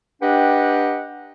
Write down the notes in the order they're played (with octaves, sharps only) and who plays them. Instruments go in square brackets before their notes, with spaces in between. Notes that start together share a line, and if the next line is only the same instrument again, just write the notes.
[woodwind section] D4 G4 B4 D#5 F#5 G5